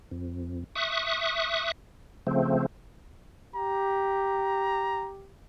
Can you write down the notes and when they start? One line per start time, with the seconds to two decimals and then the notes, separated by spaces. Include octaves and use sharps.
0.11 F2
0.75 E5 C#6 D#6 F#6
2.27 C#3 F3 A3 C4
3.56 G4 A#5